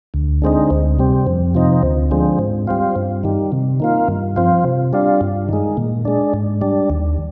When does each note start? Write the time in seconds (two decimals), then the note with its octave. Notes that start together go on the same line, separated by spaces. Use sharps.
0.14 D2
0.42 D3 G#3 C4 D#4
0.70 D2
0.99 C3 G3 C4
1.27 F2
1.54 C3 F3 C4 D#4
1.83 D2
2.11 D3 F3 G#3 C4
2.39 G#2
2.67 G3 C4 F4
2.96 G2
3.23 D#3 G3
3.52 C3
3.80 D#3 A#3 F4
4.08 G2
4.36 F3 C4 F4
4.64 C3
4.93 G3 D4 F4
5.21 G2
5.49 D#3 G#3
5.77 A#2
6.05 G#3 D4
6.34 G#2
6.61 G3 D4
6.90 D#2